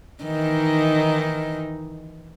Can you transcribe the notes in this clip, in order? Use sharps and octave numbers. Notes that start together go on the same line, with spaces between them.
D#3 E3 D#4